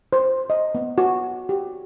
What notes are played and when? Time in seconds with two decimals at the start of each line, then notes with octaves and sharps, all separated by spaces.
0.13 C5
0.50 D#5
0.75 B3
0.98 F#4
1.49 G4